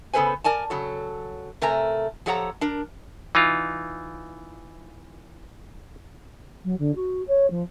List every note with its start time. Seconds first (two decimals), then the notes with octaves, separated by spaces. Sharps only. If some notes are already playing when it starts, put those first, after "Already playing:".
0.13 C#3 B3 A4 B4 C5 G#5
0.44 A#4 D5 G#5 A5
0.70 C#3 F#3 A4
1.61 C3 A3 A#4 G#5 A#5
2.26 F3 G4 A4 C#5 F#5 A#5
2.61 D4 A#4
3.35 E3 D#4 F4
6.64 F#3
6.78 D3
6.95 F#4
7.27 C#5
7.50 F3